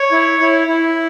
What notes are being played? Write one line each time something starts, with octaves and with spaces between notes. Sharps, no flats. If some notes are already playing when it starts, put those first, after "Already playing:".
Already playing: C#5
E4
E4
E4